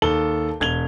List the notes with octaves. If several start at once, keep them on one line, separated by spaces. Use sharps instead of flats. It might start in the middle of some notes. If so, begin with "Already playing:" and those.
D#2 A4 G7
E1 G#6 F7 G7